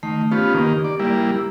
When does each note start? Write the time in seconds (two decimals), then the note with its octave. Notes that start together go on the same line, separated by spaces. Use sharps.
0.03 D#3 A3
0.32 B3 C#4 F4 G4
0.54 D#3 A#3
0.84 D5
0.99 G3 A#3 E4